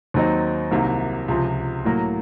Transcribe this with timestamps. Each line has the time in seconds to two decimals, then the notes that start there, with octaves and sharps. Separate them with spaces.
0.14 D#2 D#3 F#3 C4 D#4
0.71 C2 C3 D#3 F#3 A#3
1.28 C#2 C3 F3
1.85 A2 F#3 A#3